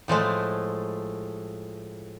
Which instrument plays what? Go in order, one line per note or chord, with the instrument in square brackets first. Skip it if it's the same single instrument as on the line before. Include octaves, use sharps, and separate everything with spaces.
[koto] A2 F3 G#3 A3